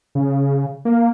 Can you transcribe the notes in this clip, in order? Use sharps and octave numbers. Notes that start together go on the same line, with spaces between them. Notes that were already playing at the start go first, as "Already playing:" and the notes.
C#3
A#3